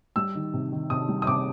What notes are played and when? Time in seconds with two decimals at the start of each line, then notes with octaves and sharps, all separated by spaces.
0.16 G3 E6
0.35 D#3
0.53 C3
0.72 D#3
0.90 C3 D#6
1.08 G3
1.22 D#6
1.27 C3 D6